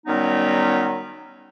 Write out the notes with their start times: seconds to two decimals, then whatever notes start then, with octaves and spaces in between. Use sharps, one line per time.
0.07 D#3 F#3 G3 B3 C#4 D#4